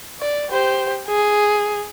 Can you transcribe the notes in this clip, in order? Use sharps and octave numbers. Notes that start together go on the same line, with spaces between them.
D5
G4 C5
G#4